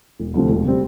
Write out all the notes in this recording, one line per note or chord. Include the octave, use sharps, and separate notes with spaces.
E1
D2 C3 F3 C4
E1
C3 G3 C4